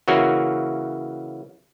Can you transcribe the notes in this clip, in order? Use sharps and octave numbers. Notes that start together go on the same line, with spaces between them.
C#3 E3 F#3 A#3 F#4